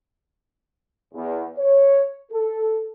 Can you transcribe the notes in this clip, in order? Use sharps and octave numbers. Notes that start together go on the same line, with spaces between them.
E2
C#5
A4